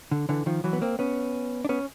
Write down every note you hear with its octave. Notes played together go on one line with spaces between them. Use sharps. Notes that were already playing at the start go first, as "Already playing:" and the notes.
D3
D3 E3
D#3 F3
E3 F#3
B3
A#3 C4
B3 C#4
D4
B3 C#4